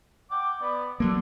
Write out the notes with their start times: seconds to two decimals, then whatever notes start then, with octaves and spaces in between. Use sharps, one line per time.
0.31 F#5 G5 D6
0.60 B3 D5
1.00 D3 F#3 A3 A#3